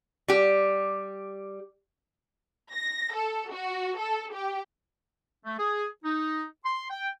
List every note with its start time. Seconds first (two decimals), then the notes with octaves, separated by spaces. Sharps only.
0.28 G3 G4
2.72 A#6
3.15 A4
3.51 F#4
3.98 A4
4.33 G4
5.46 A3
5.59 G#4
6.05 D#4
6.65 C6
6.90 G5